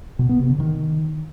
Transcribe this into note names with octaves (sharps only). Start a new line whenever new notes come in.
B2
B3
C3
D3
D#3